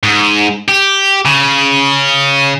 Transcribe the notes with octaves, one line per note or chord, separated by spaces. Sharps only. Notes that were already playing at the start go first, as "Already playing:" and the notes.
G#2
G4
C#3